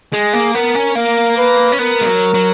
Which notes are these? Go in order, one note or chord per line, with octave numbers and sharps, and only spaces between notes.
G#3 G#4
A#3
B3 A#4
C#4
A#3 A#4
B4
C#4
B3 A#4
G#3
F#3
F#3